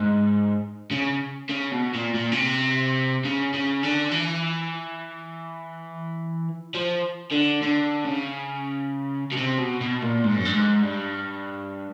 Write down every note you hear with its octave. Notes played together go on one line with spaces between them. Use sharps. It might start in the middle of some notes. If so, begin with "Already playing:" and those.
Already playing: G#2
C#3
C#3
B2
A#2
A#2
C#3
C3
C#3
C#3
D3
E3
F3
D3
D3
C#3
B2
C3
B2
B2
A#2
G#2
F#2
G2
G#2
G2